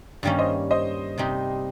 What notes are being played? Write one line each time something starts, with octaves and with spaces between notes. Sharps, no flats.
G2 D#3 G3 A#3 C#4
C5 D#5
C5 D#5
C3 G3 C4 D#4 G4